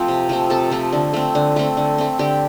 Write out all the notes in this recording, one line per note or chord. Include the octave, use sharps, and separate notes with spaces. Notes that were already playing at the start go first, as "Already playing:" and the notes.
Already playing: F3 A3 C4 F4 F5
C3
F3 A3 C4
C3 A4 A5
F3 A3 C4
D3
A3 C4
D3
A3 C4
D3
A3 C4
D3 G4 G5